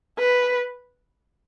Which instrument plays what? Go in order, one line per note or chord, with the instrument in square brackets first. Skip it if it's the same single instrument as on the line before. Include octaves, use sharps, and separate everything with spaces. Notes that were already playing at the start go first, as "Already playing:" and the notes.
[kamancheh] B4